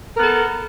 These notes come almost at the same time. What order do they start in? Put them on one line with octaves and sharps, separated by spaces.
A#4 B3 A4